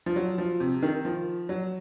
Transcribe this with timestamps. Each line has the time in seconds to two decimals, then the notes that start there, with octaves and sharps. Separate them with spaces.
0.06 F3
0.16 F#3
0.38 F3
0.60 C3
0.82 D#3
1.05 F3
1.49 F#3